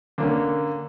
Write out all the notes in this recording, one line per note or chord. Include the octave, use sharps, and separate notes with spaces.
D3 A#3 C#4